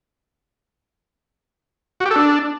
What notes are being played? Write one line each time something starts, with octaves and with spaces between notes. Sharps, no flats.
F#4
G4
A4
D4